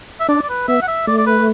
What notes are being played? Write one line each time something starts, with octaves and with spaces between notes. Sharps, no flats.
E5
D4 D5
D5
B4
B3 E5
F#5
E5
A3 D5
D5
B4